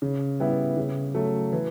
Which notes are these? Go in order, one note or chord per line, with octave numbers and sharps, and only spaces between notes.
C#3
G3 B3 E4
C#3
F#3 A3
E3